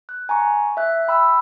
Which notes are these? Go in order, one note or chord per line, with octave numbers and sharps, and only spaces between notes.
F#6
G#5 A#5 C6 C#6
E5 F#6
G5 B5 E6